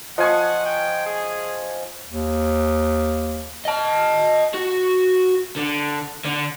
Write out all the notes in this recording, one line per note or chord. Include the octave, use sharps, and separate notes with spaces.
F3 D#5 F#5 G#5 C#6
G5
G#4
D#2
D#5 A5
F#4
D3
D3